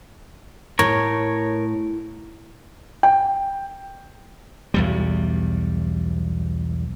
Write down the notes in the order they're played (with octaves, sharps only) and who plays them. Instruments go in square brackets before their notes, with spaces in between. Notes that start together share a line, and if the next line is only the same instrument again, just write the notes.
[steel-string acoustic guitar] A2 [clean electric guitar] A#4 C#5
[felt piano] G5
[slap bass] B1 E2 G3